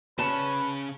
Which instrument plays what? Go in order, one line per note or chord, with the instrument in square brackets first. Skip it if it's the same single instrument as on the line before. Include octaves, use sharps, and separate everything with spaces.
[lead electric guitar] C#3 C#4 [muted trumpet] B4 [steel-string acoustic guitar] A5